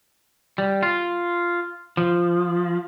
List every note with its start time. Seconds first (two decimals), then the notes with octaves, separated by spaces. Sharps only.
0.58 G3
0.83 F4
1.97 F3